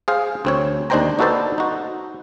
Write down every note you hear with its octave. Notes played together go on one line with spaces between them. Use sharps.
G#4 C5 F5
D2 C4 C#5
D#2 D4 D#4 C5 G5 A#5
D#4 F#4 A4 B4 C5 D5
D#4 F#4